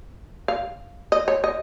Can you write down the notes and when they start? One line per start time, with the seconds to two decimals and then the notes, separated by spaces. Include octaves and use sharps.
0.48 F5
1.12 D#5
1.28 C#5
1.44 D#5